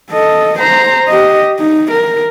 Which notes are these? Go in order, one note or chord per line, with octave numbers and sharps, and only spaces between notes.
A4 D#5
C5 A#5
G4 D#5
D#4
A#4